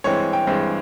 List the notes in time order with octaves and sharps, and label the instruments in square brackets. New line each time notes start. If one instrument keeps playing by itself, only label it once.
[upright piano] G2 E3 G#3 C4 C#5
G5
G2 E3 G#3 C4